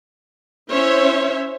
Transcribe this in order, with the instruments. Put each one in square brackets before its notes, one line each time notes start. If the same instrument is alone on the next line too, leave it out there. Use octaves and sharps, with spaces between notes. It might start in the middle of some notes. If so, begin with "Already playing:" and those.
[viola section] C#4 E4 C5 C#5 E5